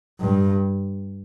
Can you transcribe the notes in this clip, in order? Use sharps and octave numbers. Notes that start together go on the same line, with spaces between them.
G2